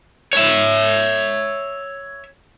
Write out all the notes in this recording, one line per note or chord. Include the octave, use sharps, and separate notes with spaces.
C#5 E5